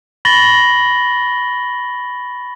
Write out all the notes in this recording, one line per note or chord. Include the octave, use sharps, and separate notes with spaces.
B5 C#6 A6 A#6 F#7 G7